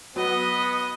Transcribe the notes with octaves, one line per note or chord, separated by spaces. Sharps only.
F#3 B3 D#5